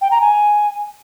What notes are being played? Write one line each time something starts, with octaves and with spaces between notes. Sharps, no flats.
G5
A#5
G#5